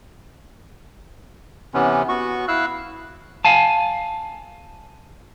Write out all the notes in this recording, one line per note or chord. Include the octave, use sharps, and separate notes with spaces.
C3 E3 B3 C#4
B3 F#4 C#6
E4 F5 E6 F#6
F5 G#5 A5